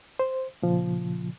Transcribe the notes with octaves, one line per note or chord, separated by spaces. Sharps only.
C5
A#2 C#3 F3